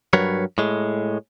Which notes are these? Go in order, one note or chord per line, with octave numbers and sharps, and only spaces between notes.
G2 F#3 A#4 B4 C#5
A2 G#3